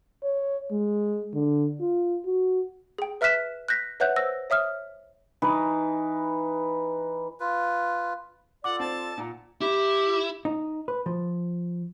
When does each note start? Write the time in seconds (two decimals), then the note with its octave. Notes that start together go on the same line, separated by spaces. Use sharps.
0.23 C#5
0.71 G#3
1.34 D3
1.80 F4
2.25 F#4
2.98 G#4 G5
3.21 B4 E5 F6 F#6 B6 E7
3.68 F#6 G6 A#6 B6
4.00 B4 C#5 E5 F#5 F#6 G6
4.16 C5 E6 A#6
4.50 C#5 E5 D#6 F6
5.42 E3 D#4 B4
7.40 F4 B4
8.64 F4 A4 D5 F#5 D6
8.80 C4 A5
9.18 A#2 F#5 A#5
9.61 E4 G4
10.45 D#4
10.88 B4
11.06 F3